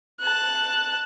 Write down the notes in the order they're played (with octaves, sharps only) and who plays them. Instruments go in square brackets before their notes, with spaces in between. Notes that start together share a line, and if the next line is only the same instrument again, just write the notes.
[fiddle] A5 F#6